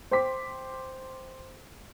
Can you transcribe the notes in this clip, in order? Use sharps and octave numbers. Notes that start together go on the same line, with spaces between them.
C5 G5 C6 D6 B6